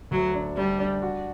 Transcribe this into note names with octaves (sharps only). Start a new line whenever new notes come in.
D2 F#3
D4
G3 D4
D4
F#4